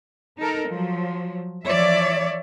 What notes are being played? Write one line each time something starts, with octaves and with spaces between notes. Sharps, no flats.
D#4 A4 A#4
F3 F#3
E3 F3 C#5 D5 E5